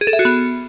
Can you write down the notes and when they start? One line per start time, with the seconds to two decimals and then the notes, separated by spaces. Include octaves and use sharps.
0.01 G#4
0.07 A4
0.13 E5
0.19 F#4
0.25 B3